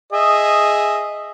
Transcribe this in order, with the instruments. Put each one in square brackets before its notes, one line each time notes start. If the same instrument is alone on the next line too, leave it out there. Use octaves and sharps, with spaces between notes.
[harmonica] G#4 D#5 E5